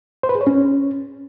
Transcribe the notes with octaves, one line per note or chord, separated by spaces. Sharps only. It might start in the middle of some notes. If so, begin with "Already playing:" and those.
C5
B4
G#4
C#5
C#4